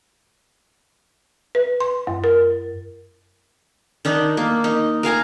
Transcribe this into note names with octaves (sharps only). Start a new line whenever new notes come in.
B4
C6
F#2
A#4
D#3 D4 D#4
A#3
D#4
A#4 F5 G#5 A#5